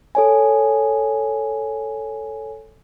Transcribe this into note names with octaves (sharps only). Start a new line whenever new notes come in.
A4 C#5 G#5